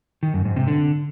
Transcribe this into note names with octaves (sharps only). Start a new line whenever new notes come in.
D#3
F#2
G#2
C3
D3